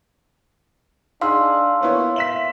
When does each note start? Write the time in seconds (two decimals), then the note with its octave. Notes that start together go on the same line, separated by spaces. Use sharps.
1.21 D4 D#4 G#4 F5 C6 E6
1.81 A#3 B3 E4 C#5
2.16 E5 B6 E7 F#7